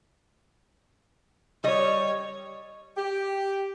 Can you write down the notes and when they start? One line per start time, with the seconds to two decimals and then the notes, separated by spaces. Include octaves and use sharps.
1.64 G3 C#5 D#5
2.96 G4